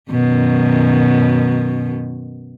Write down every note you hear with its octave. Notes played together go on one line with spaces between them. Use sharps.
F#2 B2 D#3